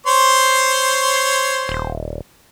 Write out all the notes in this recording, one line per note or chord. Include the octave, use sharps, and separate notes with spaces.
C5 C#5 C6
D#1